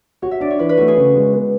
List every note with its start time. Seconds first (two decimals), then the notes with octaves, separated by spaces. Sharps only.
0.22 F#4 C#5
0.31 E5
0.41 D4 D5
0.50 C#5
0.59 E3 B4
0.69 B4
0.77 A3 F#4
0.88 G#4
0.97 C#3
1.16 G#3
1.33 B3